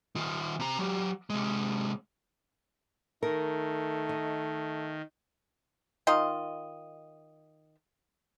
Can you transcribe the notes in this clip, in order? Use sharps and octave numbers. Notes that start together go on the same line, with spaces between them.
D#3 F4
C3 A#5
F#3 G4
C3 G#3
D#3 A3 A#4
D#5
D#3 F4 D#5